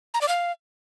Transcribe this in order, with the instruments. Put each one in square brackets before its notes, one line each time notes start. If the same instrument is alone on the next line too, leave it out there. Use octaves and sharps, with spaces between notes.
[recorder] A#5
D5
F5